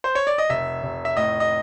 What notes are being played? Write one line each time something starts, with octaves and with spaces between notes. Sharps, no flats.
C5
C#5
D5
D#5
F1 E5
F1
E5
A2 D#5
D#5